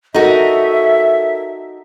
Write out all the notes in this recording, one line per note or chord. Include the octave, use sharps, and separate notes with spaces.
D#4 F#4 A4 A#4 E5